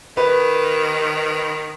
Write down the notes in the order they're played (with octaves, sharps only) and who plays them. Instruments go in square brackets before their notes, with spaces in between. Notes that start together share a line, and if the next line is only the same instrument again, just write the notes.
[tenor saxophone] D#3 [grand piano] B4